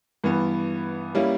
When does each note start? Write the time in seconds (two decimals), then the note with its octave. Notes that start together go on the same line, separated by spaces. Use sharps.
0.24 G2 E3 B3
1.15 G3 A#3 C#4 E4